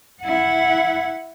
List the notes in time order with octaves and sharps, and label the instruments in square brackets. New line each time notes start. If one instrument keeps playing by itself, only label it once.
[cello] E4 F#5